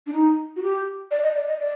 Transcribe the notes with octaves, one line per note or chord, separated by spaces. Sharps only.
D4
D#4
F#4
G4
D5
D#5
D5
D#5
D5